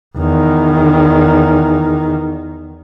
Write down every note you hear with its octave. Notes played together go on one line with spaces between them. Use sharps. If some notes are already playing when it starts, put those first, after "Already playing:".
E2 D#3